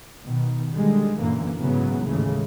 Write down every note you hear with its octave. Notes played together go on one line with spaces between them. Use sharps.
B2 D#3
D3 D#3 G3 G#3
F#2 A#2 D3 E3 A#3
G#2 C#3 E3 F#3 B3
D#2 A2 C#3 E3 G#3 A3